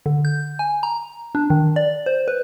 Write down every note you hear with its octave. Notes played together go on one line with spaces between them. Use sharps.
D3
G6
G#5
A#5
D4
D#3
D5
C5
B4